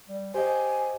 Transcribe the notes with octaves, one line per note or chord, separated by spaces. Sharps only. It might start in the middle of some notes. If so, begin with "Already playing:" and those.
G3
G4 C5 D#5 G#5